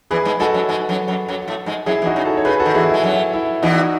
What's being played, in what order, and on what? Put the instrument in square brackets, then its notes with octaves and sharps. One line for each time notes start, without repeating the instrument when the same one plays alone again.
[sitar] E2 E3 [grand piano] G#4 B4
[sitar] G#2 G#3
[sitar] G#2 G#3 [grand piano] F#4 A4
[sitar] F#2 F#3
G#2 G#3
F#2 F#3
F#2 F#3
F#2 F#3
A2 A3
G#2 G#3
[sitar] F#2 F#3 [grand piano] E4 G#4
[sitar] E2 E3
[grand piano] D#4 F#4
[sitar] C#3
[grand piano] F#4 A4
C#5
[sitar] C#3 [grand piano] G#4 B4
[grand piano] F#4 A4
[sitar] D#3
[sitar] E2 E3 [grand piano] E4 G#4
[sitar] G#3 [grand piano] E4
[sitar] F#2 F#3
[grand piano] E4
[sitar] E2 E3 [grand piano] D#4 F#4